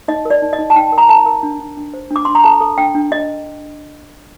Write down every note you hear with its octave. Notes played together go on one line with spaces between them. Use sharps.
D#4 D#5
A#4
D5
D#4
D#5
D#4
A5
D#4 G5
A#4
A#5
A#4 A5
A#4
D4
D4
D4
C5
D4
D6
D4 C6
A#5
A4 A5
A4
D4 G5
D4
D4 D#5